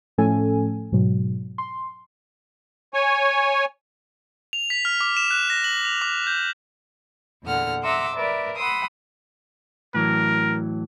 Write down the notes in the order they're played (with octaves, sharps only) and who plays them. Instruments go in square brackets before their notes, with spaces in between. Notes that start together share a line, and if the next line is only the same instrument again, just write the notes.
[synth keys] A2 F3 A3 C#4 A4 G#5
G#2 B2 F#3
C6
[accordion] C#5 G#5
[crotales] F7
B6
F6
D6
E7
F#6
A#6
F#7
F7
D6
G6
[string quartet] E2 A#2 D3 F#5 F6
E5 F#5 A#5 C6 D6 E6
A#4 B4 D5 E5
F#5 B5 C6 D#6 E6
[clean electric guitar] A2 E3 F#3 [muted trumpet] A#4